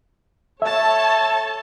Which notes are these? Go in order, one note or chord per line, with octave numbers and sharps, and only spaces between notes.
A4 C#5 E5 A5